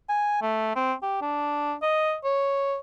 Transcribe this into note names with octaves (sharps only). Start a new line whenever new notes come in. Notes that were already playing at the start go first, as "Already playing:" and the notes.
G#5
A3
C4
G4
D4
D#5
C#5